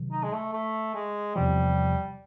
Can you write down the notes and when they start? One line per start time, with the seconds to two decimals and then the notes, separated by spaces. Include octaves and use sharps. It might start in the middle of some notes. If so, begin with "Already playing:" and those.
Already playing: C3 D#3 F#3
0.12 D#4
0.23 G#3
0.33 A3
0.53 A3
0.95 G#3
1.36 E2 C3 F3 G3